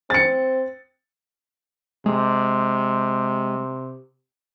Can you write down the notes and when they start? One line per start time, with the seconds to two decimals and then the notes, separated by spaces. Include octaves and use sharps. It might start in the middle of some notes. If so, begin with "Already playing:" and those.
0.10 C4 A6 C#7
2.06 C3 G#3